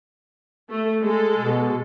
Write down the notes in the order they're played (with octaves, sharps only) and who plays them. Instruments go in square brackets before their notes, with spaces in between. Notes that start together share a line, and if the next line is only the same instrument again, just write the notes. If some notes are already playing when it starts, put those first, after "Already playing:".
[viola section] A3
G#3 A4
[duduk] B2